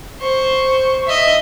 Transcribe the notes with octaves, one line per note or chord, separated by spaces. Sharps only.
C5 C#6
D#5 E5